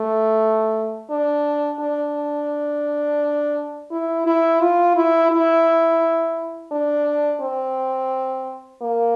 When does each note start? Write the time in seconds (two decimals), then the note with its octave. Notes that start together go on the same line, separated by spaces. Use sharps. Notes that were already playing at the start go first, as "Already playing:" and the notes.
Already playing: A3
1.11 D4
1.80 D4
3.91 E4
4.26 E4
4.61 F4
4.96 E4
5.32 E4
6.71 D4
7.41 C4
8.82 A#3